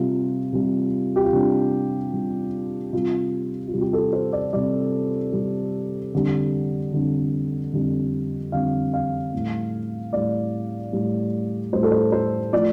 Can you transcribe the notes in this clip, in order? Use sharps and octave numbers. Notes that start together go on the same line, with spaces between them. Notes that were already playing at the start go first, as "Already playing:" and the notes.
Already playing: C3 G3 F4
C3 G3
G4
F4
C3 G3 D4
C3 G3
C3 G3 F4
F4
C3 G3
G4
A4
C5
D5
C3 G3 D5
C3 G3
F2 D3 G3
F2 D3 G3
F2 D3 G3
F2 D3 G3 F5
F5
A2 G3
A2 G3 D5
A2 G3
A2 G3 C5
A4
C5
C5
F3 A3 D5